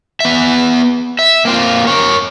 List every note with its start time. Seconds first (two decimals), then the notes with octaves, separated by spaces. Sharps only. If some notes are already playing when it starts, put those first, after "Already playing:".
0.20 B3 E5
1.19 E5
1.45 A#3 C4 F4
1.87 A#4 C#5